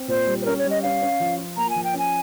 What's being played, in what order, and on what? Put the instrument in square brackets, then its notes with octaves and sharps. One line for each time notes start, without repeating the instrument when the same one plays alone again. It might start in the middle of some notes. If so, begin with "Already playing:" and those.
Already playing: [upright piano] C4
[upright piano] A#2 [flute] C5
[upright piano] G3
[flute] C5
[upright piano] C#4 [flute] A#4
[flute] C#5
[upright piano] G3
[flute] D#5
[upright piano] C#4 [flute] F5
[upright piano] C#4
F3
F4
[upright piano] A#3 [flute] A#5
[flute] G#5
[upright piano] F3
[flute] G5
[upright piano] C#4 [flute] G#5